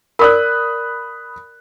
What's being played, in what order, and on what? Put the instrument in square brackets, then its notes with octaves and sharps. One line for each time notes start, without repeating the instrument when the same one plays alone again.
[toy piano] A#4 D5 [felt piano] B5 D#6 F#6